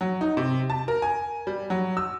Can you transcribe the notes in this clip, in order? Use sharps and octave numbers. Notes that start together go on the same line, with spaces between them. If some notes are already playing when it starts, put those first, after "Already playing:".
F#3
D#4
C3
A5
A#4
G#5
G3
F#3
E6